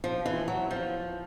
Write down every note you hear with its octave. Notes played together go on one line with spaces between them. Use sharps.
F3
E3
F#3
F3